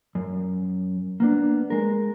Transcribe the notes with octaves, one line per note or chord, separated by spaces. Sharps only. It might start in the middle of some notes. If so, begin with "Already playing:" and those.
F#2
A#3 B3 D4
G#3 A#4